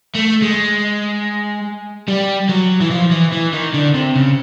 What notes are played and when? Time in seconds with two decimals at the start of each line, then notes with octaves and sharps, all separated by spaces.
0.15 A3
0.42 G#3
2.08 G3
2.49 F#3
2.81 E3
2.90 F3
3.11 E3
3.32 E3
3.53 D#3
3.74 D3
3.94 C3
4.16 C#3